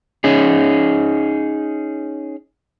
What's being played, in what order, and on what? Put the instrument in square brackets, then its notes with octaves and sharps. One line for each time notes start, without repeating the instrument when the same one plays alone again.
[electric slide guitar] C#4 D#4 G#4